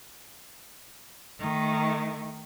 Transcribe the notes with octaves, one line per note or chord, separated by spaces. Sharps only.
D#3 A3